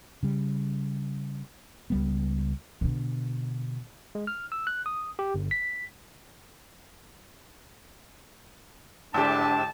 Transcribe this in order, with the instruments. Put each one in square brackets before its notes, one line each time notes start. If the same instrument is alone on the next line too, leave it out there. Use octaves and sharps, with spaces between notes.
[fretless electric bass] C#3 G3
C#2 G3 B3
[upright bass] B2 D3
[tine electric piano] G#3
F6
E6
F#6
D#6
G4
G1
B6
[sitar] G#2 G4 [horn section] D3 A5 [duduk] D4